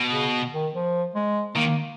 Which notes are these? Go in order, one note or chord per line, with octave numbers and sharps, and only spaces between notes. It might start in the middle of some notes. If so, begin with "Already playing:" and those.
Already playing: B2
C#3
D#3
F3
G#3
D#3 A#3